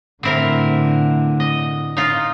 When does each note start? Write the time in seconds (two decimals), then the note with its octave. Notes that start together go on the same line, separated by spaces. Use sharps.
0.23 A2 D3 C4 E4 A#4
1.40 D#5
1.97 D#4 F4